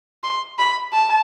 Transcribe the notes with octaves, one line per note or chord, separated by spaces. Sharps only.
C6
B5
A5